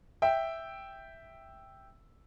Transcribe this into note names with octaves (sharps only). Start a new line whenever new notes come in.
E5 G5